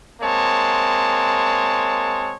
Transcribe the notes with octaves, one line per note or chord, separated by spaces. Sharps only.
G#3 A#3 C4 C#5 A5